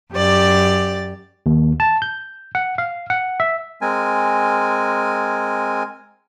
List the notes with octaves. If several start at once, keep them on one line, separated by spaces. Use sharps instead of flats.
F#2 G4 D5 A6
D#2
A5
G6
F#5
F5
F#5
E5
G#3 C4 A#4 G#5